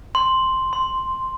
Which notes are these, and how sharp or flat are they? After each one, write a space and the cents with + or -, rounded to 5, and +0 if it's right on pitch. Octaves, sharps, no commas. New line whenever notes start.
C6 +0
C6 -15